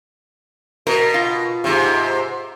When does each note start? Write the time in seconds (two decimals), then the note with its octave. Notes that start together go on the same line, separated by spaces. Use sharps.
0.87 B2 A#4
1.14 F4
1.64 G#2 C3